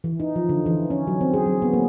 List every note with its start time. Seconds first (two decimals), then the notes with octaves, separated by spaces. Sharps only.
0.04 E3
0.20 D#4
0.36 F3
0.49 D3
0.66 E3
0.90 C#4
1.07 F#3
1.21 C4
1.34 G#4
1.46 F#3
1.62 B3
1.73 A#3